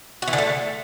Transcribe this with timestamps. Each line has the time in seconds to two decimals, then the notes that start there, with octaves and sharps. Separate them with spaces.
0.22 F#4
0.28 E3
0.33 D3
0.38 A3